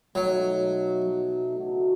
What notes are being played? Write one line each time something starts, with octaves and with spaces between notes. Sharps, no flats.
B2 F#3 A3 D#4 F#4
C#3 E3 A3 D#4 F#4